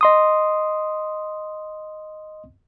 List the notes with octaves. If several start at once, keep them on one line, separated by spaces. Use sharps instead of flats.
D#5 C6 D#6